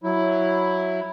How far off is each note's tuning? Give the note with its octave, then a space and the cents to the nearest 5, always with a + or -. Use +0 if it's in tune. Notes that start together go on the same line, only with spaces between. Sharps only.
F#3 +0 E4 +0